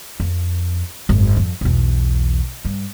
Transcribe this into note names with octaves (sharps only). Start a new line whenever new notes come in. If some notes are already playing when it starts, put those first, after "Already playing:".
F2
G#1 F#2
F2
B1 E2
G2